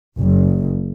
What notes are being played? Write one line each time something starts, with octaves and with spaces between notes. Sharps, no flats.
F#1